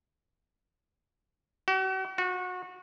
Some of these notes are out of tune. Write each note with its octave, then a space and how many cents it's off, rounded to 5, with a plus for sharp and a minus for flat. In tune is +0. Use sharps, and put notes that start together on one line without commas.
F#4 +45
F#4 -25